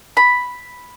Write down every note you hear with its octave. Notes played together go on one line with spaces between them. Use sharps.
B5